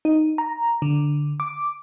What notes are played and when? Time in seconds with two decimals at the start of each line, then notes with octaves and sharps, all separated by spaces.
0.05 D#4
0.38 A#5
0.82 D3
1.40 D6